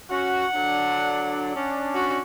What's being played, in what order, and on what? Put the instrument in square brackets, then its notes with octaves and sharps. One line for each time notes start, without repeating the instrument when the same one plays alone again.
[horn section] C#4 F#4 [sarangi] F#5
[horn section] D3 F#3 D4
C#4 D4
[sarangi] F#4